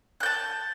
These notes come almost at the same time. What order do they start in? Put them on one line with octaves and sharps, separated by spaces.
F#6 G6 A5